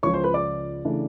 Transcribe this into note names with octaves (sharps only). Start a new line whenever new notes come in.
C#2 C#3 F3 C#5 C#6
C5 C6
B4 B5
D5 D6
C#3 E3 A3 D4